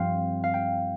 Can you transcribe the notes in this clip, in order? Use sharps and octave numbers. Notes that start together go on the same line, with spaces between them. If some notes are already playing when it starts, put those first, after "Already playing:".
Already playing: G2 F3 C4 F5 G5
F5
G5